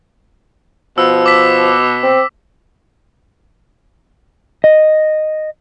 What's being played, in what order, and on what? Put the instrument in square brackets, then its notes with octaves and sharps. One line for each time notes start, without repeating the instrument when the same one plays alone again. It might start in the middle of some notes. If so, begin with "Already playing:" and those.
[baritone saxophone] B2 [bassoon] F3 [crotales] E6
[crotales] D6 B6
[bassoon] C4
[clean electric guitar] D#5